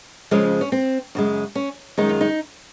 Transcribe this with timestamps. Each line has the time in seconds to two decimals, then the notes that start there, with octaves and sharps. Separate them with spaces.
0.31 F2 C#3 F3 G#3 C#4
0.61 C#4
0.72 C4
1.15 F#2 C#3 G#3
1.55 C#4
1.97 F#2 D#3 G#3 D#4
2.09 F4
2.21 D#4